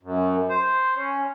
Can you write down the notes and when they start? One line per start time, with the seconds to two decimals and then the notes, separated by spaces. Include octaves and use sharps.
0.03 F#2
0.49 C5
0.95 C#4